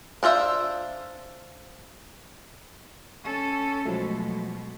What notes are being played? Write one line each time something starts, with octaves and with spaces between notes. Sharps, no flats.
D4 F4 C5 E5
C#4 A4
B2 F3 F#3 G#3 A3